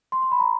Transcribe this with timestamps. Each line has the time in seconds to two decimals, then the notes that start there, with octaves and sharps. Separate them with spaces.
0.12 C6
0.22 C6
0.32 B5
0.40 A#5